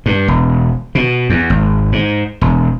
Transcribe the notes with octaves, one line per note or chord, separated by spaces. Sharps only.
G2
E1
B2
E2
G#1
G#2
E1